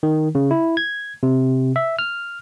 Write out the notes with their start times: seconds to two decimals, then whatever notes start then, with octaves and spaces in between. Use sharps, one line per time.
0.03 D#3
0.35 C#3
0.51 E4
0.77 G#6
1.23 C3
1.76 E5
1.99 F6